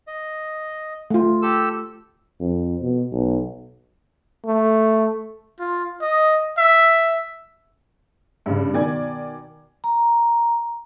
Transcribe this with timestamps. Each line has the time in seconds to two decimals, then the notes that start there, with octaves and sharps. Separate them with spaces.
0.07 D#5
1.11 A3 F4
1.42 G4 A4 E6
2.40 F2
2.82 B2
3.12 B1
4.46 A3
5.59 F4
6.01 D#5
6.58 E5
8.46 G2 C#3
8.73 B2 D#3 D5 G#5 G#6
9.84 A#5